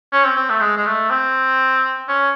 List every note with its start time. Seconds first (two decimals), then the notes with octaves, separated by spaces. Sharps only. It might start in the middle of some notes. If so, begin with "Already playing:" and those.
0.13 C#4
0.25 C4
0.37 C4
0.50 A3
0.61 G#3
0.78 G#3
0.86 A3
1.10 C4
2.08 C#4